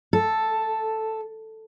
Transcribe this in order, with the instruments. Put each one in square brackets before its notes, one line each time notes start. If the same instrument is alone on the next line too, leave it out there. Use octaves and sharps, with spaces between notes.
[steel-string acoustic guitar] A4